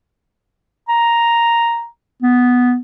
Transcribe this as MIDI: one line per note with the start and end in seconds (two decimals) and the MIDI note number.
0.89 1.87 82
2.22 2.78 59